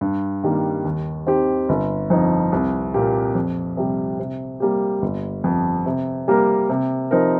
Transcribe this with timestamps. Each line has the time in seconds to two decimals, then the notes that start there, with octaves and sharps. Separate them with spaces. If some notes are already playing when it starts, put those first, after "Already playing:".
0.01 G2
0.44 D#3 G3 A#3
0.84 D#2
1.26 D#3 C4 G4
1.69 G1
2.10 F2 F3 D#4
2.52 C2
2.94 A#2 A#3 G4
3.35 F2
3.77 C3 G3
4.19 C3
4.60 G3 A#3 G4
5.02 G1
5.44 F2 F3
5.86 C3
6.28 G3 A#3 G4 A#4
6.69 C3
7.11 F3 C4 D#4 A#4